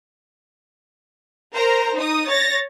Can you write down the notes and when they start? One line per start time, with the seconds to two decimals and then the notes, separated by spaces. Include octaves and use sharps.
1.54 A#4 C5 A#5
1.96 D#4 D#6
2.27 C#5 A6 A#6